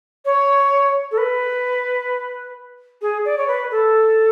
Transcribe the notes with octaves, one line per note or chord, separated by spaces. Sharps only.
C#5
A4
B4
G#4
D5
C#5
B4
A4